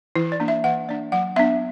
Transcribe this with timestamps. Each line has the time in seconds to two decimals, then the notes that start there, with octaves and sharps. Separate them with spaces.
0.16 E3 E4
0.32 D5
0.40 A#3 D4
0.48 E5
0.64 E3 F#5
0.88 A#3 D4 D5
1.12 F#3 F#5
1.36 B3 D4 E5